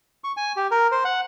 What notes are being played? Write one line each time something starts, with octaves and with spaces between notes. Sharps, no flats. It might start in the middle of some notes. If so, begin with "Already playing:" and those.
C#6
G#5
G4
A#4
C5
F#5